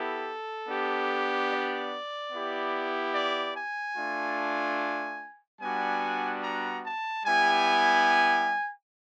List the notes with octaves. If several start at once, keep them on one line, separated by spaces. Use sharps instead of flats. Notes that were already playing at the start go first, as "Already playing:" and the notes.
Already playing: B3 E4 G4 A4
B3 D4 G4
D5
B3 E4 G4
D5
G#5
A3 D4 F4
G3 B3 D4 F#4 G#5
A#5
A5
G3 B3 E4 G4 G#5